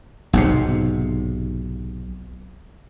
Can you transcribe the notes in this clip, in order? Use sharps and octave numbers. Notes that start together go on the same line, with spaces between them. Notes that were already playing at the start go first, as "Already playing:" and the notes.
B1 G#2 C3